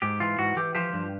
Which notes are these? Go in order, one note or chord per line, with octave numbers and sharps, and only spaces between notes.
G#2 G4
E3 F4
G#2 F#4
E3 G4
F3 G4
G2